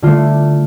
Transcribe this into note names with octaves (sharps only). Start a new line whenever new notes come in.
D3 A3 F4